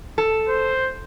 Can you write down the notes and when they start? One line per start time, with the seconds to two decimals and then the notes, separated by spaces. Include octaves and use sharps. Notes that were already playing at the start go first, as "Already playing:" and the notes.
0.18 A4
0.49 C5